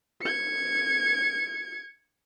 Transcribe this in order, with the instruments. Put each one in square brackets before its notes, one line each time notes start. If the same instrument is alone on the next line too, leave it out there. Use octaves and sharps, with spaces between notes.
[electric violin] G#6 C#7